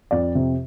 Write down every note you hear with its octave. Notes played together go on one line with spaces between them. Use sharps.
F2 D5
C3